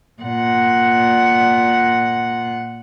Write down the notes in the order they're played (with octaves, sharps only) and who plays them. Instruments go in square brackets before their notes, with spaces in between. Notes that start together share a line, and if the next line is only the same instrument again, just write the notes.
[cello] A#2 F#5